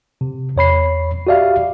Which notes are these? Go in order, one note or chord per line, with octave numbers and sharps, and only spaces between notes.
C3
E2 C#5 B5 C7
F#4 G4 D5 E5 F5